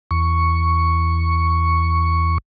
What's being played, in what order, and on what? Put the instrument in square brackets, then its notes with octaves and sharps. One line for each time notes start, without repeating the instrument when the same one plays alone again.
[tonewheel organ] E2 C#6